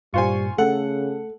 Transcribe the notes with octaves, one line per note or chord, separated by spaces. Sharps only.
G2 A#2 G3 F4 C5 G#5 C#6
C#3 A3 A4 F#5